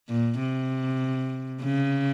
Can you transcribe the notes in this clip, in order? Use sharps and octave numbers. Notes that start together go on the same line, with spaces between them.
A#2
C3
C#3